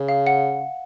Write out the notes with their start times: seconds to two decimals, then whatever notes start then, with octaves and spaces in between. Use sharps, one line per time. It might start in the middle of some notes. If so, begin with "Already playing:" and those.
Already playing: C#3
0.09 F5
0.27 F#5